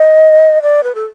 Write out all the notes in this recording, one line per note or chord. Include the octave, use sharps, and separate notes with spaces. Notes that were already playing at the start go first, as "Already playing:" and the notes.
Already playing: D#5
D5
B4
A4